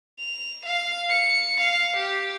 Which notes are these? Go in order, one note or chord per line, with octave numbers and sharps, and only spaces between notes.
F7
F5
C#7
F5
G4